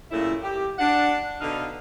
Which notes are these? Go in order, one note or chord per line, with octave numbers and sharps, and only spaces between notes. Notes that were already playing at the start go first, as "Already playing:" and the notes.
F#2 A#2 C#3 A3 E4 E5
G4
D4 F#5
B2 D3 D#4 F5